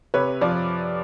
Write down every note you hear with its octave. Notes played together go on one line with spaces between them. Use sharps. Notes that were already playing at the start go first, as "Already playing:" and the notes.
C3 B4 C#5
F3 D5